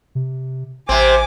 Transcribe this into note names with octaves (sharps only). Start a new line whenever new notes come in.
C3
A1 C3 C4 G#5 D6